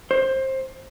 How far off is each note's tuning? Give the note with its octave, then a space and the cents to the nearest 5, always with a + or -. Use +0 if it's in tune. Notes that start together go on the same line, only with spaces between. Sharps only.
C5 +20